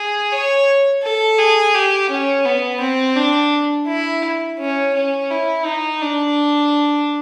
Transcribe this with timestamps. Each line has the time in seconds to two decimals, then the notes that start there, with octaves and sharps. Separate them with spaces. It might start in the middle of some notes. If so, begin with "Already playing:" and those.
Already playing: G#4
0.32 C#5
1.03 A4
1.38 G#4
1.74 G4
2.10 C#4
2.45 B3
2.80 C4
3.17 D4
3.87 E4
4.59 C#4
4.94 C#4
5.30 E4
5.66 D#4
6.02 D4